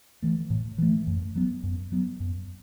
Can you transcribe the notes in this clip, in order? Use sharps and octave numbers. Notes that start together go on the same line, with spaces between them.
E3 A3
A2
E3 A3
F#2
F#3 B3
F#2
F#3 B3
F#2